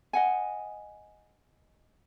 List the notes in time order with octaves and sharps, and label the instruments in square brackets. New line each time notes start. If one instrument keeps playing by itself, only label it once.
[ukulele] D#5 F#5 G#5